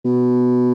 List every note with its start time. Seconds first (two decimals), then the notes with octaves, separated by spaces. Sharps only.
0.05 B2